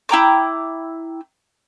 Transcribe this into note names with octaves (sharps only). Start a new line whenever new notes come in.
E4 G5 A#5 D6